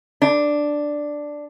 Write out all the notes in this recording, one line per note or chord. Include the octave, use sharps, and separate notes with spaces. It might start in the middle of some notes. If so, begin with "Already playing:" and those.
D4